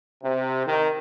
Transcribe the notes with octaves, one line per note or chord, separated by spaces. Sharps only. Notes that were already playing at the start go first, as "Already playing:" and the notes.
C3
D#3